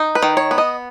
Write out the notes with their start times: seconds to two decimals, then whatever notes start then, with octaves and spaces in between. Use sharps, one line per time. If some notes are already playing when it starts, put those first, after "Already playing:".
Already playing: D#4
0.15 B4
0.23 D#3
0.37 C#5
0.51 B3
0.58 D#5